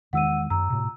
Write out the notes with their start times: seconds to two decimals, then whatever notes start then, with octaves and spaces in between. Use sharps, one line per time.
0.13 E2 D#3 G#3 F#5 E6 D#7
0.50 F#2 A#5 E6
0.70 A2 C3